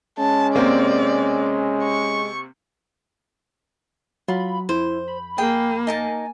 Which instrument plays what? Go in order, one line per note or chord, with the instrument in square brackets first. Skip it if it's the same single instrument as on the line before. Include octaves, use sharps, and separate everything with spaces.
[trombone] G#3 [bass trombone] C#4 [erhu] A5
[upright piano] C3 A#3 C4 [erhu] D5
[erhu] C#6
[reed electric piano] F#3 [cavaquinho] F4 [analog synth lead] B5
[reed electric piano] F2 [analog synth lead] E4 [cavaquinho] C5
[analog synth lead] B5
[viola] A#3 [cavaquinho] G#4 G5
[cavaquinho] D#4 A#4 A5 [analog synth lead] G#5